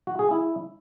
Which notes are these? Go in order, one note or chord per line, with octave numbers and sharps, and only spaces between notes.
F#4
G#4
E4